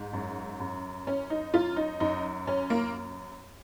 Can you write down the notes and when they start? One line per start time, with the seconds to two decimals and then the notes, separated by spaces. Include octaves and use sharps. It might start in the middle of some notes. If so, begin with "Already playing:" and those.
Already playing: G#2
0.13 F#2
0.60 F#2
1.07 F#2 C#4
1.30 D#4
1.53 F#2 F4
1.76 D#4
2.00 F#2 D#4
2.47 F#2 C#4
2.70 A#3